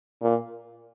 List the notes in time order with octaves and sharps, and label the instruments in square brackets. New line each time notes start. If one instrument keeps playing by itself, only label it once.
[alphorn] A#2